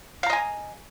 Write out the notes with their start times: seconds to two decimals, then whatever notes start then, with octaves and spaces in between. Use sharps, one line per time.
0.23 F5
0.26 A#5
0.30 D#5
0.33 G#5